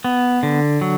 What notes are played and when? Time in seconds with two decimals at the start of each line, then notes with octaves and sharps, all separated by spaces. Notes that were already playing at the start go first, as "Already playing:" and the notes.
0.04 B3
0.43 D3
0.81 F#3